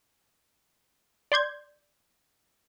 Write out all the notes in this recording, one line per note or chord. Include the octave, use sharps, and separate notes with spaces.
D5 C6 G6 G#6